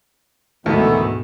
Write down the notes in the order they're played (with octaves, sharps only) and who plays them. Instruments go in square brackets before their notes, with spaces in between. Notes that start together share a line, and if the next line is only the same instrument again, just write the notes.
[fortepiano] D2 [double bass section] G#2 B2 A3 [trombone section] D#3 E3 B3 [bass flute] A4